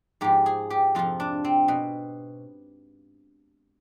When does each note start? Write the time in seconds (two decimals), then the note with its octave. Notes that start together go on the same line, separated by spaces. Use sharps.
0.21 G#2 F3 G4
0.46 G#4
0.70 G4
0.95 F2 C3 F3 F4
1.20 D4
1.44 C4
1.68 B2